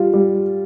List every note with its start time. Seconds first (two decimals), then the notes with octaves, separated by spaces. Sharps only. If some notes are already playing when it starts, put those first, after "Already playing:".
Already playing: G3 F4
0.14 G3